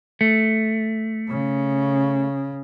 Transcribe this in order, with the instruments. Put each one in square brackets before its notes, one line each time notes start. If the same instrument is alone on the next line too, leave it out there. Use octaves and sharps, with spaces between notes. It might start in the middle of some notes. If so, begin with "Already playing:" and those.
[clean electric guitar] A3
[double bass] C#3